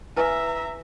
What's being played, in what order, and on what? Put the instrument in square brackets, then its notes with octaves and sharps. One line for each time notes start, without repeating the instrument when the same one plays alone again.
[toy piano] E4 B4 G#5 [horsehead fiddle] E5 A#5